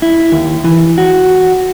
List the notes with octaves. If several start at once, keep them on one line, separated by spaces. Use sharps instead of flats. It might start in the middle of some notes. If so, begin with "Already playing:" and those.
E4
D#2
E3
F#4